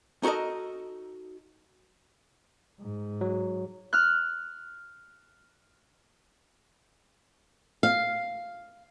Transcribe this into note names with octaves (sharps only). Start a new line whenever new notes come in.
D#4 F#4 A4 A#4 D#5
G#2
F#3
F6 F#6
F5